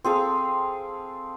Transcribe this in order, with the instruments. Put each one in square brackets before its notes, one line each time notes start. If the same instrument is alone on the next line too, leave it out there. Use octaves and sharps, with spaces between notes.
[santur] C4 G#4 A4 F5